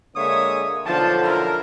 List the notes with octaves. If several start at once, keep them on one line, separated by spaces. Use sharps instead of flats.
D3 G#3 A#3 C#5 E5 D#6
B1 D3 F3 A5
E4 A#4